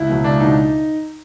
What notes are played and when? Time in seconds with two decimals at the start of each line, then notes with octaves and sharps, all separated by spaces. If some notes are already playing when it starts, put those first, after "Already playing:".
Already playing: C#2 E4
0.09 B2 F#3
0.24 C#2 D4
0.40 B2 F#3 D#4